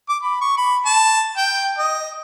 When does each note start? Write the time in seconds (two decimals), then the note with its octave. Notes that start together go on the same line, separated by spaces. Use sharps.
0.09 D6
0.23 B5
0.41 C#6
0.58 B5
0.86 A5
1.37 G5
1.78 D#5